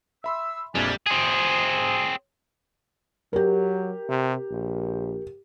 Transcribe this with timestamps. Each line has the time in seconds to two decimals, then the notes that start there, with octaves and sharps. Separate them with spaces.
0.24 E5 B5 C6 E6
0.75 A#1 F2 G3 D4 F4 G#5
1.07 C4 G#4
3.33 F#3 G4 A#4
4.08 C3
4.50 A#1